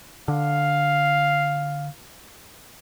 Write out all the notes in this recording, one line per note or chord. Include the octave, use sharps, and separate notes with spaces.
D3 F5